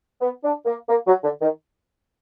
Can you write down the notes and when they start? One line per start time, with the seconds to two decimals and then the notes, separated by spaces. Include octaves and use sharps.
0.21 B3
0.44 D4
0.66 A#3
0.89 A#3
1.07 F#3
1.24 D3
1.42 D#3